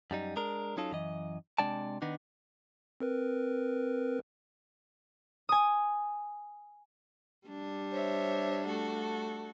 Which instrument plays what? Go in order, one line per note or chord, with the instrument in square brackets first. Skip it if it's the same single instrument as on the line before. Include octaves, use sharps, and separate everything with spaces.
[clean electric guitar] F#2 G3 D#4
G#3 D4 A#4
F#3 C#4 D#4 F4 A4
F#2 E3 D#5
C3 G#3 D4 D5 G5 A5
D#3 B3 D4 D#4
[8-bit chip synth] C4 A#4 B4
[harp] G#5 D#6
[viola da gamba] G3 D4
[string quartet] C5 C#5 E5
A3 F#4 A4